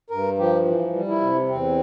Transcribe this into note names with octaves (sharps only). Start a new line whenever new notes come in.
G2 A#4
F3 G4
E3
G3
E4
C3
E2 C4